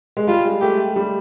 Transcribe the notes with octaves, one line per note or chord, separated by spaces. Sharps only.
G#3
G3 F4
G#3
A3 G4
G3